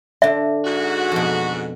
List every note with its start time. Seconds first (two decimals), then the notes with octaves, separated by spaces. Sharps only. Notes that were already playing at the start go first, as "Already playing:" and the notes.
0.22 D3 E5 C6
0.64 G#2 F#4
1.12 F2 B2